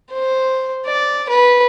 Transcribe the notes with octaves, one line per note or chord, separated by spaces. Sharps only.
C5
D5
B4